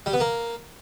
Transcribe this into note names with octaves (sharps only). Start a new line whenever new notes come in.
G3
B3
A#3